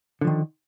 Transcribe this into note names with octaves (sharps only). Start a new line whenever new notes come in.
D3 D#3 F3